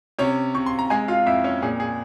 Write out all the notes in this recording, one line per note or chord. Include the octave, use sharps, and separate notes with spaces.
C3 C#4 C#5
C3 C#6
C6
A#5
G#3 G#4 G#5
F4 F5
F2 E4 E5
C#4 C#5
A#2 G#4
G#4